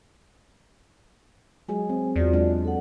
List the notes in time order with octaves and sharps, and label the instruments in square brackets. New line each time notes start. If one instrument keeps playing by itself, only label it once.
[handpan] F#3 G#3 G#4 [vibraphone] G#5
[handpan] C4
[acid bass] E2 [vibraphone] F4 F#4 D5
[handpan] F#3 G#3 D4
[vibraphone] A4 F#5